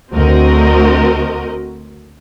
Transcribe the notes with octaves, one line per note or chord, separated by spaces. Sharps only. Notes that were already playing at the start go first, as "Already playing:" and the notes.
D2 C4 F#4 A#4 D#5